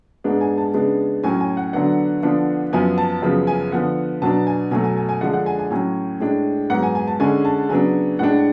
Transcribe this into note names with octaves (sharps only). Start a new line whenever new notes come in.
G#2 G#3 B3 D4
G#5
A5
C#3 G#3 B3 D4
A2 F#3 C#4 G#5
G#5
F#5
D3 F#3 B3 D4 F#5
D3 F3 B3 D4
F#2 F3 B3 G#5
A5
F#2 C#3 F3 B3
G#5
D3 F3 B3 F#5
B2 F#3 B3 D4 A5
G#5
B2 F#3 A3 G#5
G#5
G#5
G#5
D3 F3 G#3 D4 F#5
F#5
G#5
G#5
A2 F#3 C#4 G#5
A2 G#3 D4
G#2 F#3 B3 F#5
G#5
G#5
A5
D3 G#3 C#4 G#5
A5
C#3 F#3 B3 D4 G#5
A2 G#3 D4 F#5